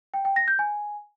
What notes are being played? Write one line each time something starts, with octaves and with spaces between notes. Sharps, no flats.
G5
G5
A#6
G6
G#5